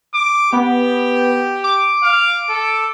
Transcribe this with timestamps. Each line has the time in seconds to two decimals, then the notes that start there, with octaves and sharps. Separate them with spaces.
0.14 D6
0.53 B3 G4
1.64 D6
2.03 F5
2.49 A4